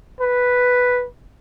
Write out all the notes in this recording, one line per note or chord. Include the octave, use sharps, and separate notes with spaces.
B4